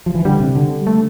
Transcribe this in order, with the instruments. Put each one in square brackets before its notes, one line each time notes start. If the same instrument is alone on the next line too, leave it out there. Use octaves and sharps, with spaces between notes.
[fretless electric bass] F3
E3
[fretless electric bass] D3 [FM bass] G3
[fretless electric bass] C3
D3
[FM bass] A3